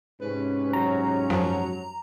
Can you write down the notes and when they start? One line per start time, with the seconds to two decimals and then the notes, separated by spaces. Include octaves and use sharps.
0.21 G#2 C3 C#4 B4
0.73 F#3 A#5
1.30 F#2 F3